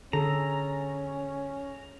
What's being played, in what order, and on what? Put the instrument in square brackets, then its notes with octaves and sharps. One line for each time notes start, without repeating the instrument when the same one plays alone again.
[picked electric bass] D3 [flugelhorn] C#4 [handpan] G#4 A4 [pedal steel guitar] A#5